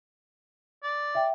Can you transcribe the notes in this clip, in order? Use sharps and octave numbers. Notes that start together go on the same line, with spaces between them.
D5
E5 G5